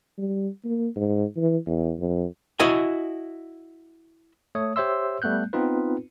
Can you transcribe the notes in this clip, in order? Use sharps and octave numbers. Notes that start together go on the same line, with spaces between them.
G3
A#3
G#2
E3
E2
F2
E4 F#4 D#5 G#5
A3 C#5 D#6
G4 C5 C#5 E5 C6 E6
G3 A3 B3 F#6 G6
B3 C4 D#4 F4 B4